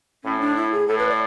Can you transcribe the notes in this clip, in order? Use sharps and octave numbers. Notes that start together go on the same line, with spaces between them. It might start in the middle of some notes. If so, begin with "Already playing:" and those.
A2 C#4
D4
E4
G#4
A2 A4
B4
D5